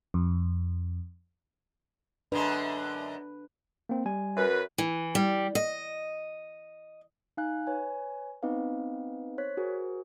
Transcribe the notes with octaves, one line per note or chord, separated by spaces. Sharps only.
F2
F#2 D3 G#3 D4 B4
A#3 C4
G3 G#5
F#2 B4
E3
G3
D#5
D#4 F5 G#5 F#6
B4 C#5 G#5
B3 C4 D#4 B4 D#5 F5
C5 C#5 F#6 B6
F#4 G#4 A#4 C5